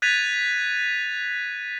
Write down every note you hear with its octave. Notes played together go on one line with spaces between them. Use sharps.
F#6 G#6 A6 B6 D#7 F7